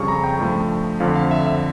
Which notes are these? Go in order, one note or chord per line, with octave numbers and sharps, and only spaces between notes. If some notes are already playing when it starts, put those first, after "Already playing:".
Already playing: F2 C#3 G3 C#6
A#5
G5
G2 F3 A3
F2 D3 F3 F5
F5
E5
E5